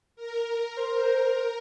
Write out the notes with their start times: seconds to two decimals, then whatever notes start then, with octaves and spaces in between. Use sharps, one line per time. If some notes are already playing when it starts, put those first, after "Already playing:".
0.16 A#4
0.77 C5